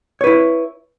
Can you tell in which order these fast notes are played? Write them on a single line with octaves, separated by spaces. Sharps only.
C#5 B4 E4